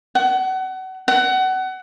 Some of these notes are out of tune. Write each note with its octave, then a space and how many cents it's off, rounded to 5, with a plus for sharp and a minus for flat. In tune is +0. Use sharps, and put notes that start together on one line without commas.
F#5 +30
F#5 +25